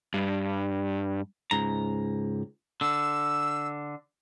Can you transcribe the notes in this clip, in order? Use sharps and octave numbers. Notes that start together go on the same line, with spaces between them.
G2
C#2 G#2 A#5
D3 E6